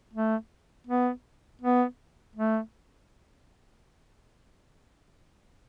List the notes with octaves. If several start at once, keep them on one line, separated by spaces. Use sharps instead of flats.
A3
B3
B3
A3